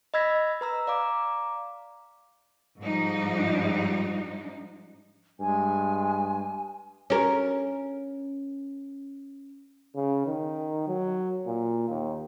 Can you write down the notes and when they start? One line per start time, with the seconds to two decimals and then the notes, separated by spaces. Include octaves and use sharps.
0.14 D#5 B5 E6 G#6 A#6 B6
0.61 B4 A#5 E6
0.87 D5 F5 A#5 D6
2.80 G#2 F3 G3 D#4
5.40 G2 G#3 G#5
7.10 C#4 A#4
9.95 C#3
10.26 D#3
10.88 F#3
11.46 A#2
11.89 D#2